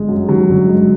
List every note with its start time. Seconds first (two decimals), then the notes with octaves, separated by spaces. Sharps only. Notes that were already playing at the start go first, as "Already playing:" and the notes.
Already playing: G1 G#3
0.09 F#2
0.29 D#3 F#3
0.49 G1
0.69 G#3